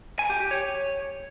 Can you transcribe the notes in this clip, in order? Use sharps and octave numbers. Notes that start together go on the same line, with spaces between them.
G#5
G4
G4
C#5